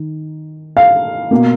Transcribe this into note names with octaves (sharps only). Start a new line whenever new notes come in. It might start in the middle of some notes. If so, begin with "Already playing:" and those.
Already playing: D#3
F5
B2 A#3